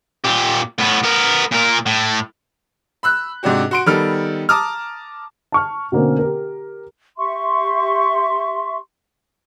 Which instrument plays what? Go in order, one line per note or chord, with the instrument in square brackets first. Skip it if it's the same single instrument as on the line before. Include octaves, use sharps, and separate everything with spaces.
[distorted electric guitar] A#2 G4
A2 B3
B3 A#4
A#2 A#4
A2
[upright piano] B5 E6 F#6
G#2 C3 D4 F#4 G4
F#4 C6 D7
D#3 G3 B3 A4 F6
A5 A#5 D6 D#6 F6
A5 C#6 F6
B2 D3 A#3 C4 C#4
G4 A#4
[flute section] G4 E5 C6 C#6